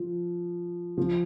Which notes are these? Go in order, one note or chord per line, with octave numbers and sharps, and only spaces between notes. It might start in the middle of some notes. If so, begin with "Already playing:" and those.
Already playing: F3
F3